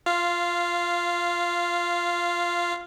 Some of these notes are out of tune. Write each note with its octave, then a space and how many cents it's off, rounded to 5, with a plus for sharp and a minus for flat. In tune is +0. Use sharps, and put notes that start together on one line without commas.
F4 +0 F5 -15